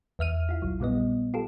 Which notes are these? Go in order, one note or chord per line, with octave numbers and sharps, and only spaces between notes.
E2 E5 F6 D#7
E4 F4
A#1 F#3
A#2 G3 B3 D#5
F4 G4 A4